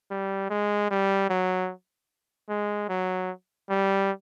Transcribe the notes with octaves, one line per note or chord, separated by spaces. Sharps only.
G3
G#3
G3
F#3
G#3
F#3
G3